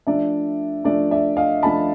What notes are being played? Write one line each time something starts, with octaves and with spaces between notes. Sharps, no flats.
F3 A3 D4 D5 E5
F3 A3 D4 D5 E5
D5 E5
D#5 F5
F3 A3 D4 A5 B5